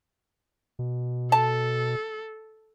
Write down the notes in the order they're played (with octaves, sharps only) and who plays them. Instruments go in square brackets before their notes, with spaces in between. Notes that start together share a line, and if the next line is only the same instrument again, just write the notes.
[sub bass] B2
[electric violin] A4 [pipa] A5